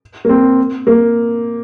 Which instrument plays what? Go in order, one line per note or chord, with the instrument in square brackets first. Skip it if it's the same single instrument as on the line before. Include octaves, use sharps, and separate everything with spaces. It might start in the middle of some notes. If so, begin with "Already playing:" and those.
[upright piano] A#3
C4
A#3